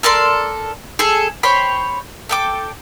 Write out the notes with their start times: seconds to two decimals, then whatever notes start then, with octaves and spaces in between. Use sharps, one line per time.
0.03 A4 A#4 D5 C6
0.99 G#4 A4
1.43 C5 C#5 G5 B5
2.29 A4 G5 D6